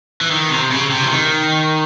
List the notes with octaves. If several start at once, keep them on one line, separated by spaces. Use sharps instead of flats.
E3
D#3
C3
C#3
C3
E3
D#3